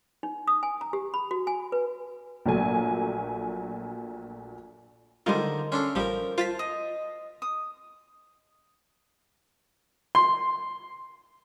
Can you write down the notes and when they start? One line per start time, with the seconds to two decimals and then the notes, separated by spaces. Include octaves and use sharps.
0.23 D#4
0.48 D#6
0.63 G#5
0.81 A#5
0.93 G4
1.14 B5
1.31 F#4
1.47 G#5
1.72 B4
2.45 A#1 A#2 F#3 A3 G#5
5.26 D3 D#3 G3 G#3 D#4 F4 C5
5.72 C#4 D4 A4 F5 C6
5.95 A1 F3 G3 A#4
6.38 F4 C5 A5 A6 B6
6.59 D#5
7.42 D#6
10.15 C6